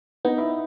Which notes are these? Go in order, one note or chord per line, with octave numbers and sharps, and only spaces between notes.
B3 D#4
E4